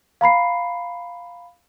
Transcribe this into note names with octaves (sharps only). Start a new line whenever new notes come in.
F5 A#5 B5 C7